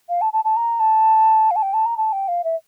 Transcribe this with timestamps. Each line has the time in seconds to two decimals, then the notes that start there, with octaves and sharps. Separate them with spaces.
0.09 F5
0.21 A5
0.33 A5
0.44 A5
0.56 A#5
0.80 A5
1.51 F5
1.56 A5
1.62 G5
1.74 A5
1.86 A#5
1.97 A5
2.12 G5
2.28 F5
2.44 E5